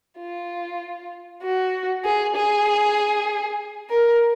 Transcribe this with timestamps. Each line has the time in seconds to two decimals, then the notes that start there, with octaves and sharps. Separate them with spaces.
0.20 F4
1.43 F#4
2.05 G#4
2.36 G#4
3.90 A#4